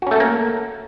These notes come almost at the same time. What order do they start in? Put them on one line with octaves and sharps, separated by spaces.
F#4 C#4 A3 A4 A#3